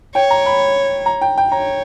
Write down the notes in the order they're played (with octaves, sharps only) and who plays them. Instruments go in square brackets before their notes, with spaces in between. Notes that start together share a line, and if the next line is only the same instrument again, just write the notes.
[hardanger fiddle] C#5 [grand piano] G5
[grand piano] A#5
B5
A#5
G5
G5
[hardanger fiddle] C#5 [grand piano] A#5